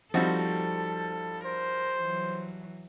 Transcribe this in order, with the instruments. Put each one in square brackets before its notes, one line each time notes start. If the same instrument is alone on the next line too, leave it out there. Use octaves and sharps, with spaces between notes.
[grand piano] F3 G3 [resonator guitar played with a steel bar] C4 D#4 F#4 [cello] A4
[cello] A#4 [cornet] C5
[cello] E3 F#3